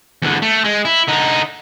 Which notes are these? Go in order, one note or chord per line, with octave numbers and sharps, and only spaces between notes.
E2 D3
A3
G#3
E4
D3 D#4